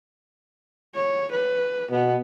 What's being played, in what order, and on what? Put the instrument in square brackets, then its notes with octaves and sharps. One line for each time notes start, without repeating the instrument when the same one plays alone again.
[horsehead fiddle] C#5
B4
[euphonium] B2 [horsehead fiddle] B3